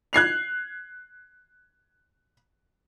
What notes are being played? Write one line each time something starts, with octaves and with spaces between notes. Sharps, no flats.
F#6 G#6 C7 F7